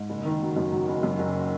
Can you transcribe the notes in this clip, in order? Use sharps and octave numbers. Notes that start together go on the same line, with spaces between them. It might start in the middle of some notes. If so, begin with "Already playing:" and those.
Already playing: G#2
F#1
D#3
F#3
F#2
F#3
F#1
F#2
F#1